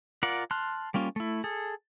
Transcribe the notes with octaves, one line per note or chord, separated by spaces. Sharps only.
F4 A#4 D5 F#5
A5 C6 F6 F#6
G3 A#3 C#4 F4
A3 E4
G#4 A4